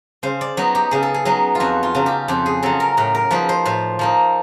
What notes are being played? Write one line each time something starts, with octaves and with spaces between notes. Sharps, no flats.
C#3 C5
D5
F#3 B3 D#4 C#5
G4
C#3 G#4
A4
G#4
F#3 B3 D#4 G#4
F4
F2 F#4
F4
C#3 F#3
G4
F2 G4
G#4
C#3 F#3 A4
A#4
A2 A#4
A#4
F3 A#3 D#4 B4
C5
A2 C5
F3 A#3 D#4